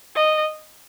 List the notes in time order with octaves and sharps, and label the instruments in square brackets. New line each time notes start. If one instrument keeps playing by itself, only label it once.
[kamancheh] D#5